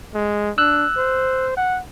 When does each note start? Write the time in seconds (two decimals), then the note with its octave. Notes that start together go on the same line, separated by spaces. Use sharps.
0.14 G#3
0.58 D4 E6 F#6
0.97 C5
1.57 F#5